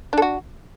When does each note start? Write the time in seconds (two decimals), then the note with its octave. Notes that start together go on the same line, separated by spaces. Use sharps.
0.13 D4
0.17 A4
0.22 F#4